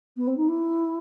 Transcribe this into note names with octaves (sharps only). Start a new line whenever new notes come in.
B3
C4
D#4
E4